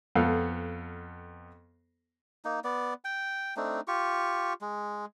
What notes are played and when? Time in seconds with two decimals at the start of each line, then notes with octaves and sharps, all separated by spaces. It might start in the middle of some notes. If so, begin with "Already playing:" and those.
0.15 F2 B3 A4 F5
2.45 A#3 D#4
2.64 B3 D5
3.05 G5
3.56 A3 C4 D4 D#4
3.88 F4 G4 C#6
4.61 G#3